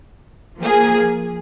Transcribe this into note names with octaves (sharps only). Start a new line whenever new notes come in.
F3 A#3 G#4